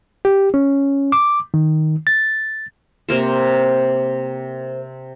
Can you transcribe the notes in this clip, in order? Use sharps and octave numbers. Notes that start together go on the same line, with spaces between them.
G4
C#4
D6
D#3
A6
C3 A#3 C5